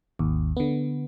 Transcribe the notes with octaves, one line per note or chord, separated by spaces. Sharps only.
G#1 D#2
D3 B3